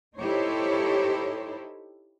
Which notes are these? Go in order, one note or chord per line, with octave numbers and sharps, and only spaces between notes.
D#4 E4 G4 A4 C5 C#5